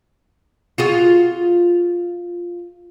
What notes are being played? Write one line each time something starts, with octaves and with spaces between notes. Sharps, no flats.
F4 F#4 G#4